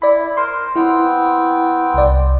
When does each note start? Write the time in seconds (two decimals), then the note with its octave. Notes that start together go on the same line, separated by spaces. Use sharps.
0.02 E4 D5 B5
0.37 A#4 C5 C6
0.76 B3 C4 E4 G5
1.94 C2 D5